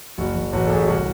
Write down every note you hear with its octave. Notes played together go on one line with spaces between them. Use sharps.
F#1 F#4
F#1
A1 F#4
A4
A1 G#4
G4
C2 F#4